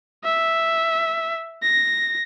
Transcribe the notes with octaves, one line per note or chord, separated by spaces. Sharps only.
E5
A#6